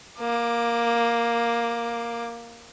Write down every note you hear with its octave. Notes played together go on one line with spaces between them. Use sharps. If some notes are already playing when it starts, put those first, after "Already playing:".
A#3 D6